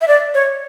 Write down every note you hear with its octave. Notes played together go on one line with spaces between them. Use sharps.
E5
D5
C#5